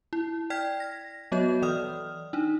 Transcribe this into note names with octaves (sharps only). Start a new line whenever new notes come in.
E4
D5 G5 F6 G#6 B6
A#6
F#3 B3 F#4 C#5 D#5 G6
E3 D5 D#6 F6
D4 D#4